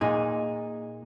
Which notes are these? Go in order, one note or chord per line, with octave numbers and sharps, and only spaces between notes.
A#2 D#4 G#4